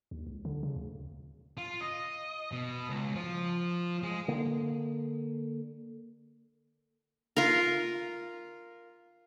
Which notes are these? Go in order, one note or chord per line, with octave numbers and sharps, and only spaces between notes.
D#2
C#2
D3
C#3
D2
F4
D#5
B2
C#2
F3
G#3
D3 A#3
F4 A#4